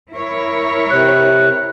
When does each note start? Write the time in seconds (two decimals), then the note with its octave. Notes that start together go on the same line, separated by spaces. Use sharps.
0.13 E4 A#4 C#5
0.91 C3 F#6